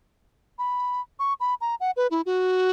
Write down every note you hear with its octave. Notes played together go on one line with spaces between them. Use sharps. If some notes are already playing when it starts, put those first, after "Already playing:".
B5
C#6
B5
A#5
F#5
B4
E4
F#4